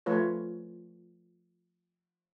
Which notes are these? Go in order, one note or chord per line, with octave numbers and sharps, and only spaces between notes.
F3 A3 F4 B4 C#5